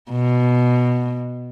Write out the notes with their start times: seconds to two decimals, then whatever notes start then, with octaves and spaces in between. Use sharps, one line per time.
0.10 B2